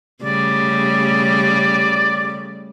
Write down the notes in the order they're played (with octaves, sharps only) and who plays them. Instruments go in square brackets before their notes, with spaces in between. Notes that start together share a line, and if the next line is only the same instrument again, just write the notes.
[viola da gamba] C#3 G3 A3 [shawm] D5